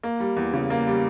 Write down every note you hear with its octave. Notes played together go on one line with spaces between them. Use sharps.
A#3
G3
E2
C#3
A#3
G3